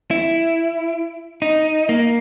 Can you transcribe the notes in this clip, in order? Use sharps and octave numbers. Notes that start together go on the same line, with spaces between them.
E4
D#4
A#3